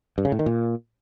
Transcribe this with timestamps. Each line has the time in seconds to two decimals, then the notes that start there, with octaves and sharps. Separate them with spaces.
0.18 G2
0.25 C#3
0.32 A2
0.39 D#3
0.46 A#2